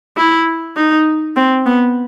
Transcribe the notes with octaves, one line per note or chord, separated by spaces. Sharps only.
E4
D#4
C4
B3